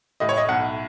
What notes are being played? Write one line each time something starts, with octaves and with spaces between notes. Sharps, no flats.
A2 D#5
C#5
D#5
B1 F#5